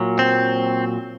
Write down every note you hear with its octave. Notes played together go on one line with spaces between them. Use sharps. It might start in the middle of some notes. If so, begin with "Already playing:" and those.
Already playing: A#2 F#3
C4